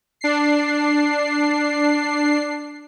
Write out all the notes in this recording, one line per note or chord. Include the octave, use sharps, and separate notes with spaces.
D4 C7